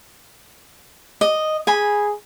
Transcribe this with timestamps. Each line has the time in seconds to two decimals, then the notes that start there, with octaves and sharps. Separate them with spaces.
1.21 D#5
1.67 G#4 G#5 B5